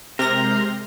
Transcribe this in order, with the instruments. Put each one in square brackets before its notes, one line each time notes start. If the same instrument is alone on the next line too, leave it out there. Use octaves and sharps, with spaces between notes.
[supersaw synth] C3 A#6 [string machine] G#3 C6 G6 [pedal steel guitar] A#4